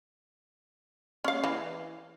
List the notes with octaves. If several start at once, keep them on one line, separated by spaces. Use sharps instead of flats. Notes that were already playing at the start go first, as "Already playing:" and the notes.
C#4 F5
E3